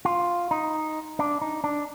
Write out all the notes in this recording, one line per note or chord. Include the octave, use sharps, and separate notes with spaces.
F4
D#4
D4
D#4
D4